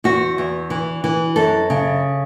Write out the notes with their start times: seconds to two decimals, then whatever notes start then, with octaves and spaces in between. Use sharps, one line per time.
0.04 E2 F#4
0.38 E2
0.70 E3
1.04 E3
1.36 F#2 A4
1.70 C#3